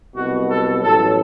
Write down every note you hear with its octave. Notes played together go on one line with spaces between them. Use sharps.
C2 B2 F#3 F#4
A4
A1 A2 F#3 A4